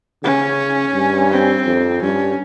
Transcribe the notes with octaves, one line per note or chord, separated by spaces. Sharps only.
C#3 C#4
G2
C4
F2
G2 C#4